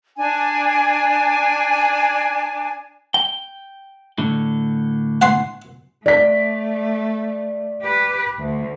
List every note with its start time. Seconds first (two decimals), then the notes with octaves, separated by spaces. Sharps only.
0.18 D4 G#5
3.14 G5
4.18 A2 D3
5.22 F#5 G#5 C6
6.06 A3 D5 B6
7.82 G4 B4
8.40 D2